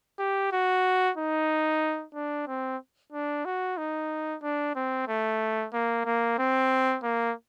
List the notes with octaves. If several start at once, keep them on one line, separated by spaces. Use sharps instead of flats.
G4
F#4
D#4
D4
C4
D4
F#4
D#4
D4
C4
A3
A#3
A#3
C4
A#3